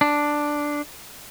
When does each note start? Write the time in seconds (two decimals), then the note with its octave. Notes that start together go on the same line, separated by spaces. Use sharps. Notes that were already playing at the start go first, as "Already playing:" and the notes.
0.01 D4